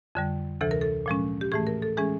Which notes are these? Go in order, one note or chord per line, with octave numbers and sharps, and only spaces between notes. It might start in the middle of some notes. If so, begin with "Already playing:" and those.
F2 D3 G3
D2 C3 E3 A4
A#4
A4
A#2 F3 G#3 C#4
G4
A2 E3 A3 G#4
A#4
A4
E3 G#3 C#4 G#4